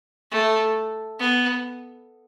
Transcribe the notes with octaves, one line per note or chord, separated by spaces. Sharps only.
A3
B3